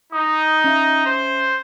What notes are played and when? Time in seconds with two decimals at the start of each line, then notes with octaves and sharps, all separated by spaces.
0.12 D#4 D#6
0.64 C#4 E5
1.06 C5